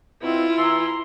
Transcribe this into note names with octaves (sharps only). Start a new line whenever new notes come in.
B2 C4 E4 F4
E3 A#5 C6 E6